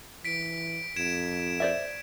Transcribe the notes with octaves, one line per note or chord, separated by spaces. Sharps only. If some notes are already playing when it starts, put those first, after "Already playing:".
E3 B6 D7
F2 G#6 D7 E7
C5 D5 E5